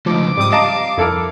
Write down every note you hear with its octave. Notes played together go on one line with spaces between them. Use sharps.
C#2 F3 A3 D#4 D6
G#2 G3 C4 D#6
D#5 F5 A5 A#5
F2 E4 A4 A#4